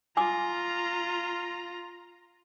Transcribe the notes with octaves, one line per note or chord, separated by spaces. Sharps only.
F4 G#5 A#5 D6 D#6